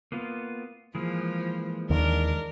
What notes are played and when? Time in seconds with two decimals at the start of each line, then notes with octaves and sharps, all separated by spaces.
0.12 A#3 B3 F4
0.95 E3 F3 G#3 A#3
1.90 D#2 D#3 D4 A#4